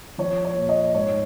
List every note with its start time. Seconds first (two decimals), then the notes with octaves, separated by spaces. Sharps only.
0.18 F3 C#5
0.45 C#5
0.56 A#2
0.69 D#5
0.95 G#2 C#5